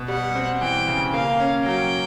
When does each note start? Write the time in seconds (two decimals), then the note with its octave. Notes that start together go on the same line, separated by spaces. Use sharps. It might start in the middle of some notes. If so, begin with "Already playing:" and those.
Already playing: B2
0.08 G3 F#5
0.35 C4
0.61 E3 G5
0.88 C#3
1.14 A#3 F5
1.40 C#4
1.65 F#3 G5